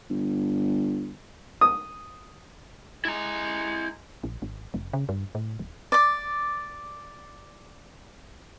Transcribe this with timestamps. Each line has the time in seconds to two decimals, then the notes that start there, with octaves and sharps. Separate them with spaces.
0.10 G1
1.61 D#6
3.05 G#3 E4 A#5
4.24 A#1
4.42 G#1
4.74 F1
4.93 C#3
5.09 G2
5.35 A2
5.59 D1
5.92 D5 D6